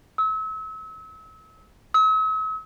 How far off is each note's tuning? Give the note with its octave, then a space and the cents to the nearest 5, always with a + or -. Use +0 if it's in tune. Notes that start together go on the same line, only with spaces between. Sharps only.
E6 -35
E6 -45